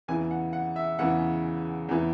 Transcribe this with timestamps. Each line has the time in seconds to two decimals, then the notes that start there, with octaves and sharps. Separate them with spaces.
0.08 E2 C#3 E3 G#5
0.31 F#5
0.53 F#5
0.76 E5
0.99 E2 C#3 E3 F#5
1.89 E2 C#3 E3